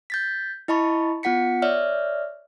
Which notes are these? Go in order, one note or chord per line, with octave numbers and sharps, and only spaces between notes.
G6 A6 B6
E4 D#5 A5 B5 C#6
B3 F4 F#5 B6 C#7
C#5 D5 E5 F6